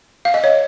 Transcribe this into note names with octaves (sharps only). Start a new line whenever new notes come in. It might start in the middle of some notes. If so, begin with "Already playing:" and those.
F5
D#5
C#5